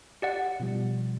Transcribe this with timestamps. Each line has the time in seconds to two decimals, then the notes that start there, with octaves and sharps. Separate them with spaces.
0.22 G4 D5 F#5
0.60 B2 F3 G3